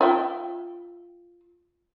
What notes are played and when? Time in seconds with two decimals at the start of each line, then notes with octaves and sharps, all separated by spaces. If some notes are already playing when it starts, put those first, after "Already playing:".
0.01 F4 E5 G5